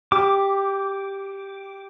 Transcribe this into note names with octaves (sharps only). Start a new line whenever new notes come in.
G4 D6